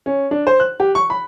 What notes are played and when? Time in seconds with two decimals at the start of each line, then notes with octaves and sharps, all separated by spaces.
0.06 C#4
0.31 D4
0.47 C5
0.60 F#6
0.80 G4
0.95 C#6
1.10 B5